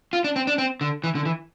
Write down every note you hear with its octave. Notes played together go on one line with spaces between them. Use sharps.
F4
D4
C4
D4
C4
D3
E3
D3
E3